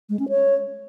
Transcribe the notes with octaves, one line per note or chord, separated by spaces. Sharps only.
G#3
C#4
C#5